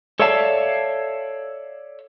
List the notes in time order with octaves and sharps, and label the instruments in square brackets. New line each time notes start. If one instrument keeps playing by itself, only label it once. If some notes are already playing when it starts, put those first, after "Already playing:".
[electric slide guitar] A4 C#5 D5 E5 F5 A5